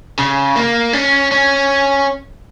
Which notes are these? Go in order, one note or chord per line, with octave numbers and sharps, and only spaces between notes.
C#3
A#3
C#4
C#4